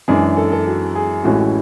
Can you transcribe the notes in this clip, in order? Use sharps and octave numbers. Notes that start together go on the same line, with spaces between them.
F#2 E3 G#3 D4 G#4
A4
A4
F#4
G#4
A1 A2 G#3 C#4 E4 F#4